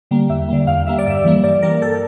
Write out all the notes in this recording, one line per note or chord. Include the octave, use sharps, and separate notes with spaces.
D3 G3 A#3
E2 E5
D3 G3 A#3
E2 F5
D3 G3 A#3 E5
D5
G2 E5
E3 G3 A#3
G2 D5
E3 G3 A#3 A#4
G2 A4